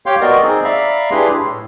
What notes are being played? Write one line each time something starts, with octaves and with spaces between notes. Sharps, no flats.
G4 C#5 F5 G5 C6
B3 F#4 A#4 D5 D#5
C4 D#4 G#4
D5 E5 F5 A#5 B5
D4 E4 G4 G#4 B4 C6
A2